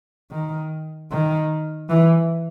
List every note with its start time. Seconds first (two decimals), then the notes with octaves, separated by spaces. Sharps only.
0.31 D#3
1.11 D#3
1.89 E3